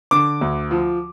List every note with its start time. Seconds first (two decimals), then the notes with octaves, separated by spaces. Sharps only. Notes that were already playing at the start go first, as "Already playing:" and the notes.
0.11 D3 D6
0.41 D2
0.71 F3